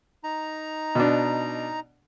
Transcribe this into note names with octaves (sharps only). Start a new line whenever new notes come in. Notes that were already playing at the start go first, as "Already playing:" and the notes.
D#4 A#5
B2 D4